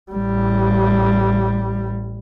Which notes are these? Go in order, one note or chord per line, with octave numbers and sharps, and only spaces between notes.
A1 G3